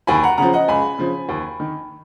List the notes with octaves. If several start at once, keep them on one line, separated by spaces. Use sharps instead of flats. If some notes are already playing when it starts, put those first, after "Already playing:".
D#2 G#5 B5
F#5 A#5
C#3 F3 F#5 A#5
D#5 F#5
C#2 G#5 B5
C#3 F3
D#2
D#3